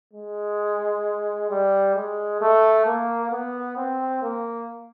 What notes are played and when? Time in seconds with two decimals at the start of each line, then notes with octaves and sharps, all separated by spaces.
0.13 G#3
1.50 G3
1.95 G#3
2.41 A3
2.86 A#3
3.31 B3
3.77 C4
4.22 A#3